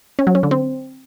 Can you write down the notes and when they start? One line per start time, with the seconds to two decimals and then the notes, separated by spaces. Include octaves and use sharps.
0.19 C#4
0.27 F#3
0.35 C#4
0.43 D3
0.51 C4